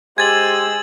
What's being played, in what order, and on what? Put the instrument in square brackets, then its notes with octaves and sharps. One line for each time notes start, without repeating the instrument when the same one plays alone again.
[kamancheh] G#3 E6 [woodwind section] G4 C5 [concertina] G#5 [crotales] G#6 A6 F#7